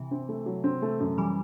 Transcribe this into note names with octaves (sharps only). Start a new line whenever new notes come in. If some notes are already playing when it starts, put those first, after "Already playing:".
Already playing: C3 E3
C4
A3
F#3
C4
A3
F#2
E3 G3